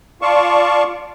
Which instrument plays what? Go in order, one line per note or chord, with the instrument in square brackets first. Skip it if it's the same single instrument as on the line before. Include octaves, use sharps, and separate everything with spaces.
[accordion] F4 D5 F5 A5 C#6